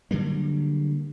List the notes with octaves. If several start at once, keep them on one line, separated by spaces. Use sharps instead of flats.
D3 F#3 G3 A#3